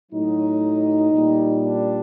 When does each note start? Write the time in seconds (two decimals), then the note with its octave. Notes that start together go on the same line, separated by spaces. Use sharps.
0.12 A2 F#3 D#4
1.13 A#2 G3
1.65 D4